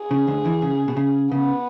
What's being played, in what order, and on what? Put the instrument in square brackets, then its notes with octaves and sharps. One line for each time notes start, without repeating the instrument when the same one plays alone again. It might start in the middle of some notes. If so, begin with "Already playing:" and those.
Already playing: [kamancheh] G#4
[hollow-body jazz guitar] C#3
D2 D3
E2 E3
C#3
B2
C#3
[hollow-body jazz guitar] C#3 [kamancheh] B3